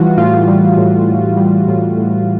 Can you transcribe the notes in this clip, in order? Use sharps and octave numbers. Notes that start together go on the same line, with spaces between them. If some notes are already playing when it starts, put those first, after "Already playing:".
Already playing: E3 G3 F4 F#4
A2 F4
G3
A2
A2
G3
A2
A2